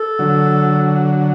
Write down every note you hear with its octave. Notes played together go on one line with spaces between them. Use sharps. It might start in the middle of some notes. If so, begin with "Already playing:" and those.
Already playing: A4
D3 F#3